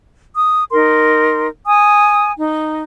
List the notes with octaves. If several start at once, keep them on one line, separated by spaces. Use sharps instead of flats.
D#6
D#4 A#4 C6
G#5 D#6
D#4